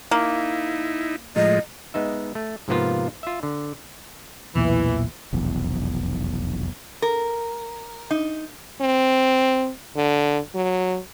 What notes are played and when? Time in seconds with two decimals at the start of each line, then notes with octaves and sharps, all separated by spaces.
0.11 A#3 D#4 E4
1.36 A2 F3 G#3 D#5
1.94 G#3 B3 D#4 E5
2.35 A3
2.68 G#2 C3 F3 A#3 B3 F4
3.23 F4 E5
3.43 D3
4.56 B1 E2 A#2 E3
5.33 F1 B1 E2
7.02 A#4
8.11 D#4
8.81 C4
9.96 D3
10.55 F#3